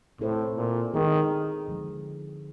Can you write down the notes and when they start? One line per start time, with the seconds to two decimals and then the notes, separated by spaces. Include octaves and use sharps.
0.19 A2 C4 E4 A4 C5
0.57 A#2
0.94 D#3 G#3 B3 D#4 G#4
1.68 D3 F3 G#3